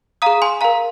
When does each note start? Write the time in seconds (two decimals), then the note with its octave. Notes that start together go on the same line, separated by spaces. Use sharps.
0.22 G#4 F5 A#5 D#6
0.42 G#5 C6
0.61 A#4 F5 A#5